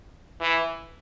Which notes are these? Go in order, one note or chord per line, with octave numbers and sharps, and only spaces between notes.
E3